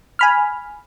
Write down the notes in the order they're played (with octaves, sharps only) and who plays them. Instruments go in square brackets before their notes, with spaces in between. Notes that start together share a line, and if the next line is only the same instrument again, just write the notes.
[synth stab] G#5 B5 F6